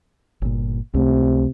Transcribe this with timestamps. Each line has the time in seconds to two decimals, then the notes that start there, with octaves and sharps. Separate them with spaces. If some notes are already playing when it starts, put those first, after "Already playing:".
0.42 G1 A#2
0.94 C#2 C3 A3